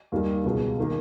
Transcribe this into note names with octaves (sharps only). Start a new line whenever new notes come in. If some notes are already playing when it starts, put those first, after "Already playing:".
D#2 D#3 G3
C#2 B2 G#3
D#3 A#3